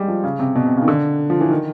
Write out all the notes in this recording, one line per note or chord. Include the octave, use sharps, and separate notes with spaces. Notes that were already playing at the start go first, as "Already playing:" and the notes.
Already playing: G3 G#3
F3
C#3
C3
B2
C3
C#3
D#3
D3
F3
E3
D#3